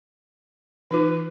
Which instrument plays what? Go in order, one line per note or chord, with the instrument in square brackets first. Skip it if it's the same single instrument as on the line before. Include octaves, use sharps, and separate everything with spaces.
[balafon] E3 D#4 F4 [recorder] B4